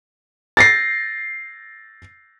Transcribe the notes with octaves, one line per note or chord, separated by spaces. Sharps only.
A6 A#6 C7